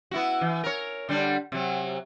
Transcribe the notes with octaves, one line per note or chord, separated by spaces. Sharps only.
B3 E4 F#4
E3
A#4 C#5
D3 G3 D4
C3 F#3